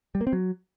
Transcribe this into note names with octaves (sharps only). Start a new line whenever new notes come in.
G3
A#3
C4
F#3